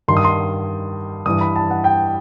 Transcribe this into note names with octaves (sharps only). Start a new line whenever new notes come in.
G2 D#3 C6
D#6
C6
G2 E3 D#6
B5
A5
F#5
G5